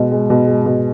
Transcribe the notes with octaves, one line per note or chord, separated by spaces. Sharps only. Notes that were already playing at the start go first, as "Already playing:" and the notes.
Already playing: B2 G#3
G#3
B2
G#3
B2